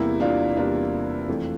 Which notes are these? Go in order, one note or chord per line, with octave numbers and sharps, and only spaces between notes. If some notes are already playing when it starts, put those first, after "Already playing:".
Already playing: E2 C3 G3 A#3 E4
D4 F4
E2 C3 G3 A#3 D4 F4
F2 E3 A3